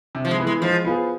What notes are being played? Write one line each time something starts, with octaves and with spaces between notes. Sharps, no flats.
C3
F3
G#3
E3 B3
G#3
F3 G#3
B3 F4 G#4